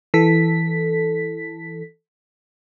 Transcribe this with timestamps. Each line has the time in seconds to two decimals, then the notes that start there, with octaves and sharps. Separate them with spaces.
0.14 E3 A4 B6